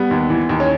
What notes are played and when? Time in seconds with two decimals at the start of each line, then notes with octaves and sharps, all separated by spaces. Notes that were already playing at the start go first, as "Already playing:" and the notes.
Already playing: G3 B3
0.11 D#2
0.30 E3
0.49 D#2
0.60 C#4